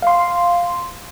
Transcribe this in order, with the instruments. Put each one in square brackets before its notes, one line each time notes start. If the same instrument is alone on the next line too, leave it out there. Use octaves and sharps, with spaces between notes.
[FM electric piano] F5 C6